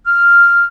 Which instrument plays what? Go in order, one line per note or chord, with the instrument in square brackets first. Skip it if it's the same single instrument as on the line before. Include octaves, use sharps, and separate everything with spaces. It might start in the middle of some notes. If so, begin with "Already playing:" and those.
[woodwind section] F6